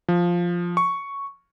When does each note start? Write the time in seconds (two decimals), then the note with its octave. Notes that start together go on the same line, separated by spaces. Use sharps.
0.08 F3
0.77 C#6